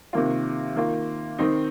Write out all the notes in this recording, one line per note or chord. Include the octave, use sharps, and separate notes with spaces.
C3 D#3 A#3 F4
D#3 A#3 F4
D#3 C4 D#4